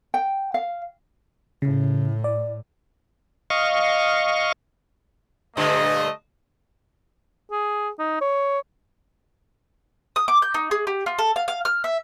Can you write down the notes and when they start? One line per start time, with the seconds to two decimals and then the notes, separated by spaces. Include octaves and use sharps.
0.14 G5
0.54 F5
1.62 A2 C#3
2.24 D5
3.50 D#5 F5 C#6
5.57 G2 A#2 D3 A3 D#5
7.51 G#4
7.99 D#4
8.21 C#5
10.16 D#6
10.28 D6
10.42 G6
10.54 D#4
10.71 G#4
10.87 G4
11.06 F4
11.19 A4
11.36 F5
11.48 F5
11.65 F6
11.84 E5